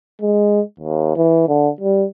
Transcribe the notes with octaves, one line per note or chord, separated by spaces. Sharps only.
G#3
D#2
E3
D3
G3